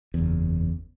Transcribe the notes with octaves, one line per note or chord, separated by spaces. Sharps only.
F#1 E2